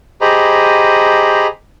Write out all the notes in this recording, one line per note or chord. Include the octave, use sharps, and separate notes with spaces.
G4 G#4 C5 D#5 A#5 B5